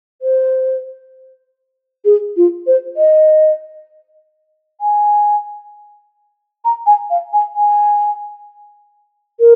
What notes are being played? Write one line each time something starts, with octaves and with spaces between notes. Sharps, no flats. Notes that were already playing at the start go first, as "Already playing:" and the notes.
C5
G#4
F4
C5
D#5
G#5
A#5
G#5
F5
G#5
G#5
A#4